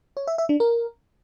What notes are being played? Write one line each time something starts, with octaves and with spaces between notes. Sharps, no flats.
C#5
E5
E5
D4
A#4